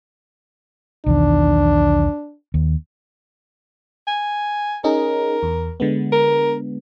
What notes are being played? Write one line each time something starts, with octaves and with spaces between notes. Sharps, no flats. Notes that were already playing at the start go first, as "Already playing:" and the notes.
B1 E2 D#3 D4
D#2
G#5
C#4 D#4 G#4 A#4
E2
D3 G#3 B3
A#4